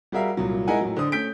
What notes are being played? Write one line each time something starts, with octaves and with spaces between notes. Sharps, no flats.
G3 F#4 G#4 A#4 E5 F5
C2 A#2 F#3
G#3 D#4 E4 A#4 F#5 G#5
A2 F#3
D3 D4 C5 D#6
A3 C#4 G6 B6 D7